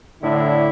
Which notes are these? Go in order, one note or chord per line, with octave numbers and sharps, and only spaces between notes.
A2 D3 E4